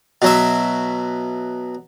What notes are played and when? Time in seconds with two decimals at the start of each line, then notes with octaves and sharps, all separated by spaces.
0.22 B2 F#3 E5